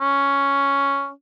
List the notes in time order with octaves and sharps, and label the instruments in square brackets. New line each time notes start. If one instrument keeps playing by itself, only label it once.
[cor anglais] C#4